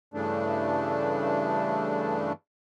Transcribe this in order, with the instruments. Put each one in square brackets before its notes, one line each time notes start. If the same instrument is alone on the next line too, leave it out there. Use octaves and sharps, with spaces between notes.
[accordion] G2 C#3 E3 A3 D4